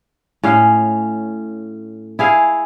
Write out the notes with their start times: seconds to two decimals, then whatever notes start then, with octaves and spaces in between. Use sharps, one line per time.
0.43 A2 C#4 F5
2.19 E4 G#4 F5